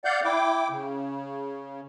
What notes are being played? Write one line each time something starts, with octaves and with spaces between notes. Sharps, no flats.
D5 F5 F#5 G6
E4 G5 D6
C#3